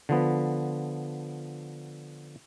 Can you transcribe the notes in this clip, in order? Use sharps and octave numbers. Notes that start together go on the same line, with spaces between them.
D3 F3 B3